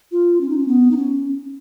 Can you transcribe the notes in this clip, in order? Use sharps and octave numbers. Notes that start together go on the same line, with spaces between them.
F4
C#4
D#4
C#4
B3
D#4
C#4